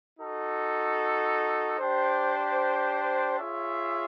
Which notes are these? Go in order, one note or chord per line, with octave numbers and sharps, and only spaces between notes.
D#4 F#4 A4
D4 G4 C5
F4 G#4 C#5 E5